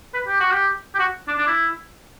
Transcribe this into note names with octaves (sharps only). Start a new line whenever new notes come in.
B4
G4
F#4
G4
G4
F#4
D4
D4
E4